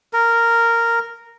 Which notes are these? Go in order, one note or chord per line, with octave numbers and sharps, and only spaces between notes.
A#4